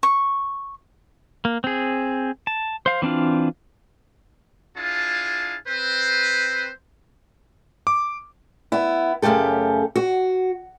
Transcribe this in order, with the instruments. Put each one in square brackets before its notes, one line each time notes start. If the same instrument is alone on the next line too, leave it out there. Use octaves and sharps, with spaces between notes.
[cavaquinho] C#6
[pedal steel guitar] A#3
C4 G#4
A5
C5 F5
E3 C4 D4 F4
[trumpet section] D4 E4 F4 G#4 F5 A5
C4 B4 C5
[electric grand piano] D6
[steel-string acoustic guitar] B3 E4
F#2 C#3 A3 G4 A4
F#4